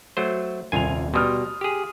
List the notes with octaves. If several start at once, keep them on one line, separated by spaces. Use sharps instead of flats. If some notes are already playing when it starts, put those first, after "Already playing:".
F#3 A3 C5
D#1 C2 F4 G#5 F7
B2 G3 C6 D#6 F6
G4 G#4